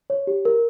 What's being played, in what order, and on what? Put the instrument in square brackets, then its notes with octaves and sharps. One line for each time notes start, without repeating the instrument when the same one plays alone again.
[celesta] C#5
G4
A#4